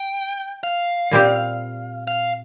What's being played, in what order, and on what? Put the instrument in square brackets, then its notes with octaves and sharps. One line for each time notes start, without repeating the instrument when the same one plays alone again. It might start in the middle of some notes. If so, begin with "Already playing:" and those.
Already playing: [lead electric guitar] G5
F5
[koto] A#2 G3 C4 G4
[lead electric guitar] F5